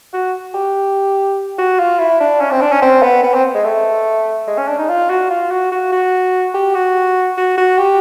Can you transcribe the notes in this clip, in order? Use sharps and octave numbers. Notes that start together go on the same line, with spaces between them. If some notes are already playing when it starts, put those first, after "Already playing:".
F#4
G4
F#4
F4
E4
D4
C#4
C4
D4
C#4
C4
B3
B3
C4
G#3
A3
G#3
C#4
D4
D#4
F4
F#4
F4
F#4
F#4
F#4
G4
F#4
F#4
F#4
G4